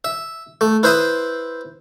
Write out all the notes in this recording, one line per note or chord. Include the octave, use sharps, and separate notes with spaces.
E5
A3
E4 B4 C5 E5 B5 D#6